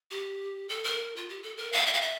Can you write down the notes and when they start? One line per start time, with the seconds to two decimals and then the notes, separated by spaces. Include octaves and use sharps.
0.11 G4
0.69 A4
0.84 A#4
1.16 F4
1.29 G4
1.43 A4
1.57 A#4
1.72 F5
1.87 E5
1.93 F5
2.01 E5